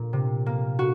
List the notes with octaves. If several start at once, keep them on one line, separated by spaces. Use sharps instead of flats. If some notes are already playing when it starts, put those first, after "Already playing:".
Already playing: A#2
C3
A#3
F#4